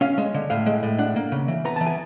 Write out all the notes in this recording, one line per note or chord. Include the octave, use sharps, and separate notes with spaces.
C#4 F5
G#3
D3
A2 F5
G#3
A2
D4 F#5
A#3
C#3
E3
B3 A#5
E3 A5
G#5